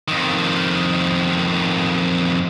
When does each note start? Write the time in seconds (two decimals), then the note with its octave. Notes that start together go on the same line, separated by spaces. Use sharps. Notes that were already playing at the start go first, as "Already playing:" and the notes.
0.08 F2 D#3